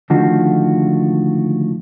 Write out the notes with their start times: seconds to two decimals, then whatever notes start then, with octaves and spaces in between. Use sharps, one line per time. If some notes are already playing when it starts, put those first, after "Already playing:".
0.10 C#2 D3 D#3 F3 A3 F#4